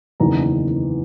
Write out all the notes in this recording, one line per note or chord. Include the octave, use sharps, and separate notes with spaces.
F#1 E2 D#3 A#5